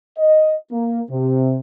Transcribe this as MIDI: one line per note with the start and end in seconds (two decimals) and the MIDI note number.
0.18 0.55 75
0.71 1.00 58
1.10 1.58 48